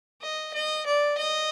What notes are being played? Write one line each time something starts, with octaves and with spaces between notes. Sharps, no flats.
D#5
D#5
D5
D#5